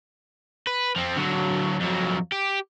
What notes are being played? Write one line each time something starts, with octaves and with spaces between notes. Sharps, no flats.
B4
F3 C4
D3 F#3
F2 F#3
G4